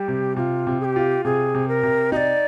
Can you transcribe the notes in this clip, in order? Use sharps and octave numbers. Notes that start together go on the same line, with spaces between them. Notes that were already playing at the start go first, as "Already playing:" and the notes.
Already playing: G3 G4
C3
C3 F4
C3
G#4
G4
F4
C3 G#4
C3
A#4
C3
D#4 D5 D#5